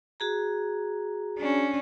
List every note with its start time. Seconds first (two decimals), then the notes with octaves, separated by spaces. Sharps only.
0.20 F#4 G#4 A#5
1.38 C#4 D4